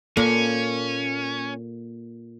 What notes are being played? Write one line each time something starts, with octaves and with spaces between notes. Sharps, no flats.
A#2 A#3 C#4 A4